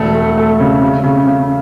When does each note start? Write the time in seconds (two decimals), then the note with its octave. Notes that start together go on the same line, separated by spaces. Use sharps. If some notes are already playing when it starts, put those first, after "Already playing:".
Already playing: E1 A3
0.15 A3
0.37 A3
0.60 C#3
0.81 C#3
1.04 C#3
1.27 C#3